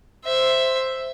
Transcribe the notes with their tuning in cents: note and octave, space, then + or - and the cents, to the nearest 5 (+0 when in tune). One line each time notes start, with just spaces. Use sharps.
C5 +0 E5 +0